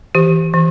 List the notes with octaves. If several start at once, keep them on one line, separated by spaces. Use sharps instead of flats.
E3 G4
E3